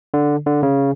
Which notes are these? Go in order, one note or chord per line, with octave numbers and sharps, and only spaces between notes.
D3
D3
C#3